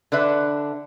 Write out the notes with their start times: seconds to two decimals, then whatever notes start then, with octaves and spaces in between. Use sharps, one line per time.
0.12 D3 D4 B4 E5